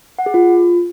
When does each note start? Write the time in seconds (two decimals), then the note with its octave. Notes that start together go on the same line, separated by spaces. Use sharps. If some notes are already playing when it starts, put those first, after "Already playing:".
0.19 F#5
0.26 G#4
0.34 F4